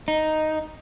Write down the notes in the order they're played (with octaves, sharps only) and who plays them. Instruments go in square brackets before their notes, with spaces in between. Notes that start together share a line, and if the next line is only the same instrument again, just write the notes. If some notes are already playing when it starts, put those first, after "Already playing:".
[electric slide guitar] D#4